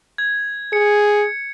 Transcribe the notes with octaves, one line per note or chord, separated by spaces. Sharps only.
G#6
G#4 C#7